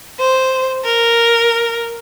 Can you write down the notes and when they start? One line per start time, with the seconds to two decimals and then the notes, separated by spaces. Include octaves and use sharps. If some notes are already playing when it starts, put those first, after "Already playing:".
0.19 C5
0.84 A#4